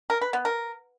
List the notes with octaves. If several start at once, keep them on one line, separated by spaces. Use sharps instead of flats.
A#4
B4
B3
A#4